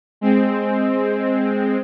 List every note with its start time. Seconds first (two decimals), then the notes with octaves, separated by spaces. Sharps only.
0.21 G#3 C4